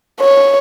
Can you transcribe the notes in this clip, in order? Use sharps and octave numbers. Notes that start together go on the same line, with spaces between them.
C#5